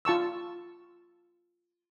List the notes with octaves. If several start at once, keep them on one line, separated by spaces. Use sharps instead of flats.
F4 A5 C#6 E6